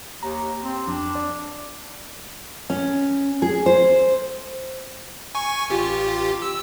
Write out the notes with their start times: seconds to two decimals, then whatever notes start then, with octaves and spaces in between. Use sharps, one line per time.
0.23 D#2 A#5
0.63 C4
0.87 F2 D4
1.15 D5
2.70 C#4
3.42 G#4
3.66 C5
5.35 G#5 C#6
5.69 A1 F4 G4
6.42 E6